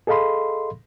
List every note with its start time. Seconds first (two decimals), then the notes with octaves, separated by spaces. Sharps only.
0.07 G#4 A4 D#5 F5 B5 C6